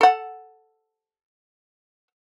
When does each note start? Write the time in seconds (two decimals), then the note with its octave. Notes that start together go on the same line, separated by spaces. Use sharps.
0.01 A4 F#5